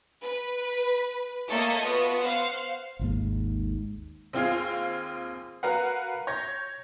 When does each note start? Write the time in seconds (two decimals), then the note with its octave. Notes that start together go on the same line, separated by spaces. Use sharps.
0.22 B4
1.48 A3 A#3 A4 C#5 D#5
1.82 B3 F4 F#4
2.20 C5 F5 F#5
2.99 G#1 D#2 G#2
4.33 D#2 C4 F4 G#4 F5
5.63 F#4 A#4 B4 F5 F#5
6.27 C#5 G6 A#6